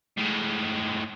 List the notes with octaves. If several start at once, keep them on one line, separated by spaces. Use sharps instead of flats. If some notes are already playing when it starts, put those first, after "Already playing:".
A2 G#3